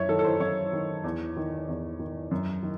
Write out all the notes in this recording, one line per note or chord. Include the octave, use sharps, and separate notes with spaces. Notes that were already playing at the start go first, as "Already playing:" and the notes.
Already playing: F#2 C#5 E5
D#3 A4
A4
C5
F#2 C#5
D#3
E2
D#3
E2
D#3
F#2
D#3